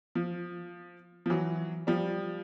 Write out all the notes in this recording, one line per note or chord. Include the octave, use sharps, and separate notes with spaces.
F3
F3
E3 F#3
F3 G3